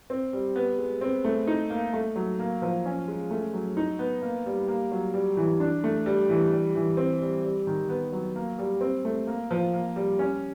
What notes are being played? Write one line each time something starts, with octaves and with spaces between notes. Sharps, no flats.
C4
G3
B3
G#3
C4
A3
D#4
A#3
A3
F#3
A#3
F3
C#4
G#3
A3
F#3
D#4
B3
A#3
G3
A#3
F#3
G3
E3
D4
A3
G3
E3
G3
E3
C4
G3
G3
D#3
B3
F#3
A#3
G3
C4
A3
A#3
F3
A#3
G3
C#4